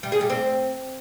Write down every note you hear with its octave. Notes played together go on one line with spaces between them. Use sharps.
G3
G#4
G3
C4